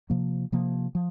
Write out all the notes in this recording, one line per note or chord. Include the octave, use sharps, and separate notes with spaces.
C3 F3 A#3
C3 F3 A#3
F3